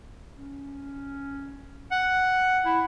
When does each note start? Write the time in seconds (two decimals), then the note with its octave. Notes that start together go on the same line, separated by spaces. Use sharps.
0.35 C#4
1.92 F#5
2.66 E4